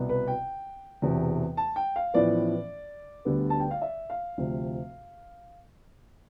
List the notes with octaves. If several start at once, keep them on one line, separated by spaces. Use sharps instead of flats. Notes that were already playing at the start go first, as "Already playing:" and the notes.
Already playing: C2 B2 B3
B4
G5
E1 E2 C3
A5
G5
F5
A1 A2 F3 B3 D5
D2 D3 G3 B3
A5
G5
F5
E5
F5
D2 C3 F3 C4